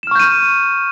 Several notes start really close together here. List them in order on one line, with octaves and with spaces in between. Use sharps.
E7 F6 C#6 G6 D#7